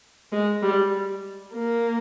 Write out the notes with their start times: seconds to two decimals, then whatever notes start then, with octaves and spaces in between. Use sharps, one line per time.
0.32 G#3
0.63 G3
1.54 A#3